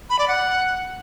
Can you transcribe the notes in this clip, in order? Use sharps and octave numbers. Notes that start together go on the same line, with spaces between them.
B5
D5
F#5